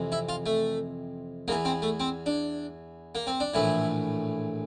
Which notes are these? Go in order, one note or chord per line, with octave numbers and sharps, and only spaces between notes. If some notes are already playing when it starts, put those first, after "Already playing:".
Already playing: F2 C3 E3
E4
F4
A3
E2 E3 A#3
C4
A3
C4
D4
A#3
C4
D4
A#1 A2 E3 E4